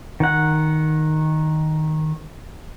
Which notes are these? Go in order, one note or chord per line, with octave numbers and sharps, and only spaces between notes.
D#3 F#5